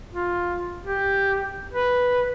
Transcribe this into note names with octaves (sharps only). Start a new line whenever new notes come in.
F4
G4
B4